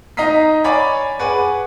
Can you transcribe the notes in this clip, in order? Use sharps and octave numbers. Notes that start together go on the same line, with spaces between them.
D#4 A#5 D#6 B6 C7
C#5 D5 G#5 B5 D6 A6
G#4 B4 F#5 G#5 C#6 D6